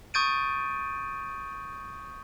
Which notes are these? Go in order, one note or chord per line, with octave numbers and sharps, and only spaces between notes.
C#6 D#6 G6 A6 D7 D#7